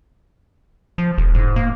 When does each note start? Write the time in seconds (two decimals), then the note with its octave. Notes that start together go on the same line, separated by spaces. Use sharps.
0.98 F3
1.18 E1
1.35 G#2
1.56 A#3